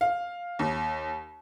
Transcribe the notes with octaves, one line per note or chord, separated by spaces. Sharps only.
F5
D#2